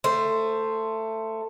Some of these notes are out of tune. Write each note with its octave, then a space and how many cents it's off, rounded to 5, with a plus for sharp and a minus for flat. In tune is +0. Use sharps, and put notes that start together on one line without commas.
A3 +15 C5 +0